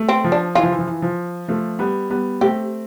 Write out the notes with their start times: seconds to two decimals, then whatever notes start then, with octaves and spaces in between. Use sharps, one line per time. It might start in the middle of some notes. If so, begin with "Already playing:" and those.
Already playing: A3
0.09 C4
0.24 F3
0.32 D4
0.55 E3 F4
0.63 F3
0.71 E3
0.78 F3
0.87 E3
1.02 F3
1.48 F3 A3
1.79 G3 B3
2.10 G3 B3
2.41 A3 C4 G4